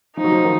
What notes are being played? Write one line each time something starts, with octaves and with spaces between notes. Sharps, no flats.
F3 D#4
F#3
F3
D#3